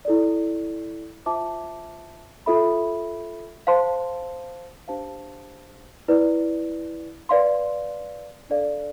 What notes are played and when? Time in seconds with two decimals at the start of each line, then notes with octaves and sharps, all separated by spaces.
0.05 E4 A4 D5
1.25 F4 C5 E5 A5 D6
2.46 F4 A4 E5 B5
3.67 C5 F5 A5 C6
4.88 D4 G4 C5 F5 A5
6.08 E4 B4 D5
7.29 B4 D5 F5 C6
8.50 D4 A4 D5 F5